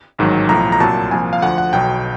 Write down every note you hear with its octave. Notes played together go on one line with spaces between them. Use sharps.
A1 G#2 D#3 F#3
B1 A2 F3 A#5
A#5
C2 A#2 F#3 A5
C2 A#2 F3 G#5
F5
D2 D3 F3 F#5
F#5
B1 B2 F#3 G5